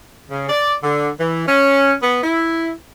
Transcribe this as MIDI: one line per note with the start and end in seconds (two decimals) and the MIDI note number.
0.30 0.48 49
0.49 0.74 74
0.82 1.08 50
1.19 1.46 52
1.47 1.92 61
2.01 2.21 59
2.23 2.70 64